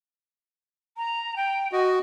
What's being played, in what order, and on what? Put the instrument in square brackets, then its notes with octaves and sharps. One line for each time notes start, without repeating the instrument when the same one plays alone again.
[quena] A#5
G5
[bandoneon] F#4 [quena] D#5